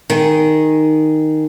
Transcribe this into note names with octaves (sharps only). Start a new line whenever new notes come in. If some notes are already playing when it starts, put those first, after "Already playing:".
D#3 G#4